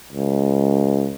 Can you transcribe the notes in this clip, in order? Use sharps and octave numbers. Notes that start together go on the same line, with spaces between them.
C#2